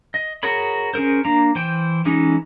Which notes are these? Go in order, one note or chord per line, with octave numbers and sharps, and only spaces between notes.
D#5
F#4 G#4 A#4 C#5 B5
C#4 G#4 A#4 C5
A#3 D4 A#5
E3 C5 G5
E3 G#3 C#4 D#4